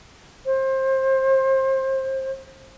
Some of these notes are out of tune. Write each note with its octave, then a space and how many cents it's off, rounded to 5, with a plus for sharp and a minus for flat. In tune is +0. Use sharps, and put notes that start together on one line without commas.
C5 +25